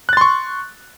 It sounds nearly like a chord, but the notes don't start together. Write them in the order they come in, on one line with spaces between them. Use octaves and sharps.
F#6 A6 C6 C#6